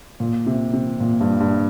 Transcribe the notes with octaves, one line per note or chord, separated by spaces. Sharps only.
A#2
C3
C3
A#2
G2
G2